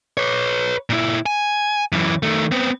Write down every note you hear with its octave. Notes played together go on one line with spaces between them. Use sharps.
B4 C#5
A#2 E4
G#5
F#2 E3
D#3 A3
B3 C4